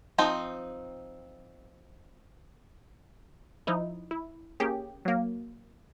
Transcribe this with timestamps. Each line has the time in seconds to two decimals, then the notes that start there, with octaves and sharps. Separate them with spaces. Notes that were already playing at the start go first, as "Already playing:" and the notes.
0.18 F3 C4 D#4
3.67 F3 D#4 E4
4.11 E4
4.60 A#3 C#4 G4 G#4
5.05 F#3 A#3